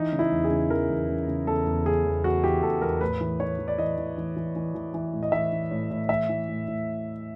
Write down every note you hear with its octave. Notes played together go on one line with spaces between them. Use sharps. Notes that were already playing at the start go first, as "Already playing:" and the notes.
Already playing: E3 D#4
C#3
E4
E2
G#4
C#3
E3 A#4
E2
C#3
C#3
E2 A4
E2
C#3 G#4
E2
E2 F#4
E3 G4
E2 A4
E2 A#4
A2 B4
E3
E3 C#5
E3
D5
E3 D#5
E3
E3
E3
E3
E3
E3
A2
D#5
E3 E5
E3
A2
A2
E3 E5
E3
A2
A2